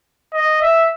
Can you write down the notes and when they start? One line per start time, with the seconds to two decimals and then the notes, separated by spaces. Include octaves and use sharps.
0.34 D#5
0.61 E5